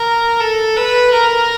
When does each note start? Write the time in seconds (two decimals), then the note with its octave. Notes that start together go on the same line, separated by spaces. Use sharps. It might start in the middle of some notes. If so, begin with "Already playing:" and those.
Already playing: A#4
0.40 A4
0.77 B4
1.13 A#4